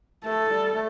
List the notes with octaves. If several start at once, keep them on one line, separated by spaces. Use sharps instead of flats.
A3 A4
G3
A3